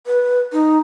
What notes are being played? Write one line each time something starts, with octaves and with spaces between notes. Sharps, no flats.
B4
D#4